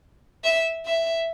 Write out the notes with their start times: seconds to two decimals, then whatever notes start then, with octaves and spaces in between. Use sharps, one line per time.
0.44 E5
0.86 E5